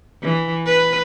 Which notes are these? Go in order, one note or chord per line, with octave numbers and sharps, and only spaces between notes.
E3
B4